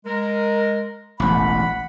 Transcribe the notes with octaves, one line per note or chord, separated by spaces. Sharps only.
G#3 A#4
E1 A1 F#5 B5